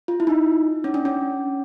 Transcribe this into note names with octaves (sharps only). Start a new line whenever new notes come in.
F4
E4
D#4
C#4
D4
C#4